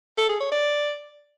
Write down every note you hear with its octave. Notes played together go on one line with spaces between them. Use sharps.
A4
G#4
C#5
D5